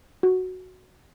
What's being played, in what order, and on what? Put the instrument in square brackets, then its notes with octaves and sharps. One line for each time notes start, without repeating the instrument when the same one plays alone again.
[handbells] F#4